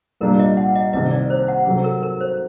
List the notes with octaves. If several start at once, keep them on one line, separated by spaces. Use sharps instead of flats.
C2 A#2 G3 A#3 D4 A#4
D#5
F#5
D#5
C2 C3 D#3 D#5
D5
C5
F#5
C3 F#3 C4 F#4 A4
A#4
A#4
C5